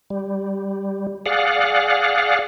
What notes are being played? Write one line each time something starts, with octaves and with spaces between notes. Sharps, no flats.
G3
G#4 D5 F5 F#5